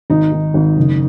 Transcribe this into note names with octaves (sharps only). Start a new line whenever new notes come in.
G#1 D#4
D#3
G#1
F#1